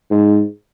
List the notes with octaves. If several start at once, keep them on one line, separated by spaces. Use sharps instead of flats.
G#2